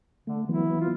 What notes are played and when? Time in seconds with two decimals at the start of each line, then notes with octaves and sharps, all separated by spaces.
0.27 D3 A3
0.49 E3 F#3 B3 E4
0.81 F4